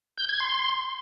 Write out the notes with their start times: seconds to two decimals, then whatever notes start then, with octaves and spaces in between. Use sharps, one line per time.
0.18 G6
0.29 G#6
0.40 C6